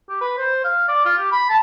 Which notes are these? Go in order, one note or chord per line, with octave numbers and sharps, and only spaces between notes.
G4
B4
C5
F5
D5
F4
G4
B5
A5